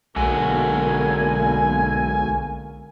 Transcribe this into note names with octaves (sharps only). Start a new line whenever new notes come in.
B1 D3 G#3 A#3 F#4 A4 G#5